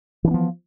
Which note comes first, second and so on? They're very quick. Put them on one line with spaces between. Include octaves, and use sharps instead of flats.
E3 D4 B3 F3